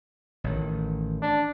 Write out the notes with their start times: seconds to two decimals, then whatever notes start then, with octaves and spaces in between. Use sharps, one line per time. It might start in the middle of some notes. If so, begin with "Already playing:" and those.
0.44 A1 D#3
1.22 D4